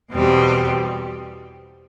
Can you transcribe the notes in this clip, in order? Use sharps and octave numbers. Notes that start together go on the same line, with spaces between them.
E2 B2 G3 C4 G4